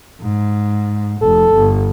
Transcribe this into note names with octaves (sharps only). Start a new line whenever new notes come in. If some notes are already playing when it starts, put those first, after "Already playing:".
G#2
F1 A4
G1